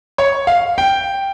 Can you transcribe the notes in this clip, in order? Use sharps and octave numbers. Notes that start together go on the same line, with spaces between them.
C#5
F5
G5